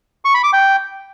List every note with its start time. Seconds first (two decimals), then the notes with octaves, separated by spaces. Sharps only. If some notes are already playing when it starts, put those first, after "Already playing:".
0.25 C#6
0.34 B5
0.44 D6
0.53 G5